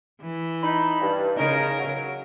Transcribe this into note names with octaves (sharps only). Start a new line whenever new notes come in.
E3
D#4 B5
G2
C#3 C#4 D#4 A#4
F#3